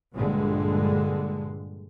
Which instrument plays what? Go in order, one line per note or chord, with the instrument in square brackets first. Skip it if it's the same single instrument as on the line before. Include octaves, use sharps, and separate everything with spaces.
[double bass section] A#1 G2 D3 G#3